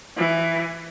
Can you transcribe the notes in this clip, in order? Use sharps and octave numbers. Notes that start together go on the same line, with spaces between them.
E3